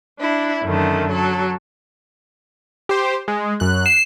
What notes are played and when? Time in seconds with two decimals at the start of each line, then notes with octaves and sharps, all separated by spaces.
0.20 D4 E4
0.63 F#2 D3 D#3 A3
1.11 F#3 A4
2.89 G4 C5
3.28 G#3
3.60 F#2 F#6
3.86 C7 E7